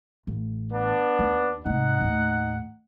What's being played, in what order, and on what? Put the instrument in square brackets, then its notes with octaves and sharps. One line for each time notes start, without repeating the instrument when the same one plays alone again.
[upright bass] A1
[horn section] B3 D4
[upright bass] D#2
[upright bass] G#2 C3 [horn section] D#4 F#5
[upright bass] D#2 A2